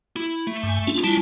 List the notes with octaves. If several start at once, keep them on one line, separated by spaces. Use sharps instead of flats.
E4
A3
G2 G#5
C#4 D4 F4
G3 C#4 E4 F4 A5